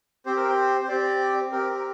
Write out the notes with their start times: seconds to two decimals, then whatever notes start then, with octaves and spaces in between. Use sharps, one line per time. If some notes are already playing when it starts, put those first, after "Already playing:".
0.26 C4 G4 C5
0.36 A#4
0.49 C5
0.84 C5
0.89 C4 G4 D5
1.52 C4 G4 A#4
1.74 A#4